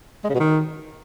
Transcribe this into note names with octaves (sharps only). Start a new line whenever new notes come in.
G#3
C#3
B2
D#3